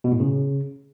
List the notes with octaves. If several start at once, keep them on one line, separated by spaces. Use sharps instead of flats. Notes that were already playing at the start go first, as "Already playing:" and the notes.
B2
A2
C#3